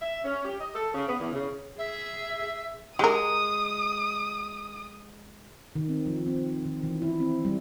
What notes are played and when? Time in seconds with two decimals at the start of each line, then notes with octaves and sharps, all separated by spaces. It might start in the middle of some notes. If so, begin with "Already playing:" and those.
0.02 E5
0.24 C#4
0.45 G4
0.60 D#5
0.75 A4
0.95 C#3
1.08 B3
1.19 E2
1.33 C#3
1.78 G#4 E5
2.99 G#3 G4 A#4 D#6
5.76 D#3
5.89 C4
6.06 F3
6.26 C4
6.65 D#3
6.84 E3
7.02 E4
7.20 C4
7.45 G3